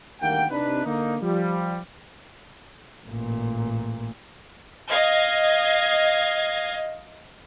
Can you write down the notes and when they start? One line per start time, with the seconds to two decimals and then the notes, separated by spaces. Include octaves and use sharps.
0.21 D2 D#3 G3 A#3 F#5 G5
0.50 C3 D4 D#4 B4
0.85 D3 A#3 D#4
1.22 F3 G3
3.06 A1 A#2
4.89 D#5 F5 G#6